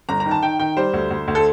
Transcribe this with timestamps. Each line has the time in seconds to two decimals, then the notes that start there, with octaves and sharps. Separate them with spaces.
0.09 G1 A#5
0.20 A#5
0.26 D#3
0.31 A5
0.43 D#3 G5
0.59 D#3 G5
0.77 G3 C5
0.93 D2
1.11 D2
1.28 D2
1.35 A4